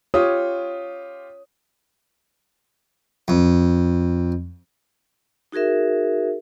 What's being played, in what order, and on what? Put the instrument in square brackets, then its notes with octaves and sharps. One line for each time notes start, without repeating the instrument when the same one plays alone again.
[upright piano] F4 G4 D#6 [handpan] C#5
[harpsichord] F2
[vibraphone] D#4 F#4 G#4 A#4 E5